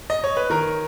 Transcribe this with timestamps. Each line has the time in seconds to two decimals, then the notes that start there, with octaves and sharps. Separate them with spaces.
0.10 D#5
0.24 C#5
0.37 B4
0.50 D#3 A#4